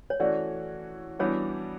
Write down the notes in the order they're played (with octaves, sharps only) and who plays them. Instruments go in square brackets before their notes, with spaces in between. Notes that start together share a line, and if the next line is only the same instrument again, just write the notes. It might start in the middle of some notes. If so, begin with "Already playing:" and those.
[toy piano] C#5
[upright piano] E3 A3 C#4 F#4 [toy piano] D5
[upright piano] E3 G3 B3 D4 F#4 [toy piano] C#5